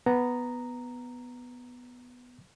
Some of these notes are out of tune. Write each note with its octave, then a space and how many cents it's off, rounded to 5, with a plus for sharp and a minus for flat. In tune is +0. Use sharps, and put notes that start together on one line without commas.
B3 +0 A#5 -5